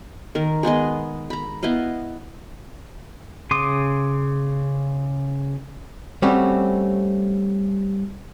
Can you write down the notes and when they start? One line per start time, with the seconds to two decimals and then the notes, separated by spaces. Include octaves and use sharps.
0.35 D#3 A#4
0.63 G#3 B3 G#4 D#5
1.30 A#5 B5
1.63 B3 E4 D#5 F5
3.51 C#3 C6 D6 D#6
6.22 G3 A3 C4 C#4 F#4